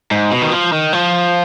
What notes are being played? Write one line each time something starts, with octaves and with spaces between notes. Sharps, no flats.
G#2
B2
D#3
F3
D#3
F3